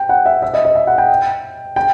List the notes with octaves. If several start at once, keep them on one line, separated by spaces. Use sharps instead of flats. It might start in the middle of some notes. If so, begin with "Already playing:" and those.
Already playing: G5
F#5
E5
E5
D#5
D#5
E5
F#5
G5
G5